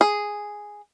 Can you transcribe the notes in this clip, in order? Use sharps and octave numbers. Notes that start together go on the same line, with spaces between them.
G#4